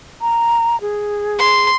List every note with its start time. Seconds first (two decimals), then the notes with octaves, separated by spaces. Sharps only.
0.21 A#5
0.81 G#4
1.39 C6